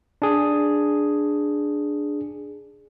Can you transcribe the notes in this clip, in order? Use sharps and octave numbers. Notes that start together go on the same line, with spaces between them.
D4 G#4